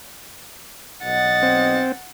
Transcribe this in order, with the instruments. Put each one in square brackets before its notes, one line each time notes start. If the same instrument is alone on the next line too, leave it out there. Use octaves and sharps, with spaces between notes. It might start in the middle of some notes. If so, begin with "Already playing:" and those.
[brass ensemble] B1 D#5 [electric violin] F#5 A6
[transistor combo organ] C4